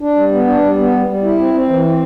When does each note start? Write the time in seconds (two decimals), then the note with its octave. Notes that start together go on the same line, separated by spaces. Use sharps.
0.01 D4
0.16 G3
0.32 B3
0.47 D4
0.62 G3
0.78 B3
0.93 G3
1.07 G3
1.23 E4
1.39 C4
1.54 C4
1.69 E3
1.85 C4